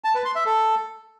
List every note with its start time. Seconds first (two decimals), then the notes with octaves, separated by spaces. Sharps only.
0.04 A5
0.15 B4
0.25 C6
0.35 E5
0.46 A4